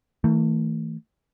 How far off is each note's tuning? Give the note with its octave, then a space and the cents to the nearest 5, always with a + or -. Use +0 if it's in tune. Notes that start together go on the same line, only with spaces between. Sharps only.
E3 -35 A3 +25